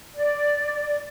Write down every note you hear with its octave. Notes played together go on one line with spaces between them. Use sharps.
D5